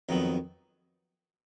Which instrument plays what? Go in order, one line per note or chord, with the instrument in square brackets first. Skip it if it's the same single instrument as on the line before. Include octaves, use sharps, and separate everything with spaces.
[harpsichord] F2 D#3 F#3 B3 D#4